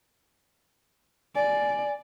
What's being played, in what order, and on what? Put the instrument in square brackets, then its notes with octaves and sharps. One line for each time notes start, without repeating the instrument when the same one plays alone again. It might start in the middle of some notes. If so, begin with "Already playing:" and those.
[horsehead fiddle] D5 [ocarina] G#5